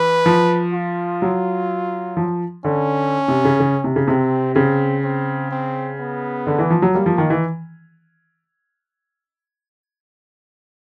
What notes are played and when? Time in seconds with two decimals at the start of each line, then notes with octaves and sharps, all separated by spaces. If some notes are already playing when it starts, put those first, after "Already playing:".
Already playing: E3 B4
0.26 F3
0.73 F4
1.22 F#3
2.17 F3
2.65 D3 C#4
3.28 C3
3.45 C#3
3.60 C#3
3.84 C3
3.96 C#3
4.07 C3 C4
4.55 C#3 C4
5.03 C4
5.51 C4
5.99 B3
6.47 D3
6.59 E3
6.70 F3
6.82 F#3
6.94 G3 A#3
7.06 F3
7.18 D#3
7.30 E3